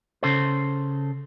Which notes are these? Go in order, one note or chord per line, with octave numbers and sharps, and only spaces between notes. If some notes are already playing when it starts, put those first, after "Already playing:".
C#3 A4 C5